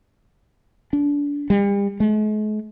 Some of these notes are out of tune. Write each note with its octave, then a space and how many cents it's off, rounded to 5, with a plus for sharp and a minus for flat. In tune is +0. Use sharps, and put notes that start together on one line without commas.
D4 -25
G3 +40
G#3 +45